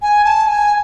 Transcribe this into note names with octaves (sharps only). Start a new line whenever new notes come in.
G#5
A5
G#5